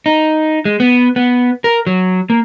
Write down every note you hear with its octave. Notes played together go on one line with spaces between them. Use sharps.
D#4
G#3
B3
B3
A#4
F#3
A#3